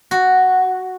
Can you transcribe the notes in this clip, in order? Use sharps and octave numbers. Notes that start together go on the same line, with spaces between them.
F#4